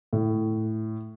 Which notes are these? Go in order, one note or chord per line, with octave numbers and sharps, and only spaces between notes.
A2